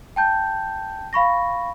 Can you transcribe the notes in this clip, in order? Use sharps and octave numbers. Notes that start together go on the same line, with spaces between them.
G5 A5 G6
F5 B5 C#6 A#6